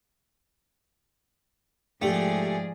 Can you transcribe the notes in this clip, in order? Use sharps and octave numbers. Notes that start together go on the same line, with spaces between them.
G#2 F3 A3 G4 G#4 D5